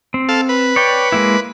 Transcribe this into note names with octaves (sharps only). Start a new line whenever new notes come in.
C4
A4 F5
B4
C#5 D5 G5
G#3 A#3 E4